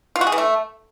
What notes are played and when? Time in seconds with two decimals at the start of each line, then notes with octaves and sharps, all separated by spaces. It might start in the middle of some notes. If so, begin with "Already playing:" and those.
0.16 F4
0.21 F#4
0.27 G#4
0.32 E3
0.38 A3